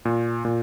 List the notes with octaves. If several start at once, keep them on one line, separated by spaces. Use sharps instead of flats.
A#2
A#2